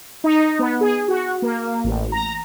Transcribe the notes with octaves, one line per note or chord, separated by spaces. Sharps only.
D#4
B3
G#4
F#4
A#3
A1
A#5